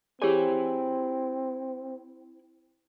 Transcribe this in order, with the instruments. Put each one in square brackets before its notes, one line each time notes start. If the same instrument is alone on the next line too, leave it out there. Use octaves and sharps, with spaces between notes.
[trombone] C4 [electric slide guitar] E4 G#5 [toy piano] G4 G#4 C#5